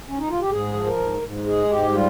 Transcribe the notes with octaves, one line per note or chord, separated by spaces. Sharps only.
C#4
D#4
F4
G4
G#2 G#4
F3
A#4
G#2
G#2
G#3 G#4
G#2 G4
G3 F4